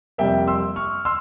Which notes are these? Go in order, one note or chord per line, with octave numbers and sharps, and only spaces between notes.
F2 C3 G3 A#3 E5 G5
C6 E6
C#6 F6
C6 E6